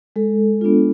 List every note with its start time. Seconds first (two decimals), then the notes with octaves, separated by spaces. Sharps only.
0.16 G#3 A4
0.61 B3 D4 F4